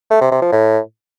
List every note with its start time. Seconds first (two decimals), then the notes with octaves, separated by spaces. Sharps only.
0.11 A3
0.21 C3
0.32 C3
0.42 F3
0.52 A2